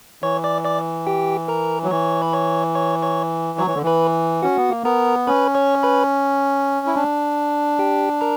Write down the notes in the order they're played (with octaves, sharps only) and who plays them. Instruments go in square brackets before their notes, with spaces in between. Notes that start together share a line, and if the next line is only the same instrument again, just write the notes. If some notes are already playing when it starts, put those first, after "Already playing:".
[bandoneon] E3 [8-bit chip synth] C#5 C#6
[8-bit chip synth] D5 D6
D5 D6
G4 G5
A#4 A#5
[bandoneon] F#3
[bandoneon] E3 [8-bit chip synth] C#5 C#6
[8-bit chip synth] B5
C#5 C#6
C#5 C#6
C#5 C#6
[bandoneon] F#3 [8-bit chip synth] C#5 C#6
[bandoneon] E3
D3
[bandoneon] E3 [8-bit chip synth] B4 B5
[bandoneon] C#4 [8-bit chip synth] F#4 F#5
[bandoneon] B3
A#3
[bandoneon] B3 [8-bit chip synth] A#4 A#5
[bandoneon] C#4 [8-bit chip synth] B4 B5
[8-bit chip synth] C#5 C#6
B4 B5
[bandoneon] E4
D4
[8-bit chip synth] G4 G5
A#4 A#5